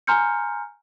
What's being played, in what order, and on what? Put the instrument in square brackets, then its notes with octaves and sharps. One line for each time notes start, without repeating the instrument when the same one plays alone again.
[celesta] G#5 A#5 C6 F6 G6 C#7